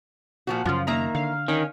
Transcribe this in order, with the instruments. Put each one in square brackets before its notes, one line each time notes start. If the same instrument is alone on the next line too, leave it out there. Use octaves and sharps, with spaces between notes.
[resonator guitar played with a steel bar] A#2 F3 F#4
[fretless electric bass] F#2 C#3 [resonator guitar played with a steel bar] F3 [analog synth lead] F4
[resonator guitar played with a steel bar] D#3 A#3 E5 [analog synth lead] A#5
[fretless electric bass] D3 [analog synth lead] F5
[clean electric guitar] D#3 [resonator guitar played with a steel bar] C#4